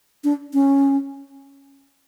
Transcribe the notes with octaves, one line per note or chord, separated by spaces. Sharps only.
D4
C#4